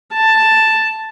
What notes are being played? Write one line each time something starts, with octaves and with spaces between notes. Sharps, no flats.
A5